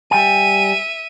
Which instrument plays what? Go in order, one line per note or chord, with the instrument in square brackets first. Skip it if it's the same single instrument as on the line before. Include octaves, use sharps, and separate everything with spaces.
[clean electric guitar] G3 G5 G#5 [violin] E5 D#7